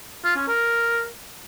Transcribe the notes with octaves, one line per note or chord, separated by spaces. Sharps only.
F4
C#4
A#4